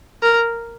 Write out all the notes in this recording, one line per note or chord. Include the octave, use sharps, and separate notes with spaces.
A#4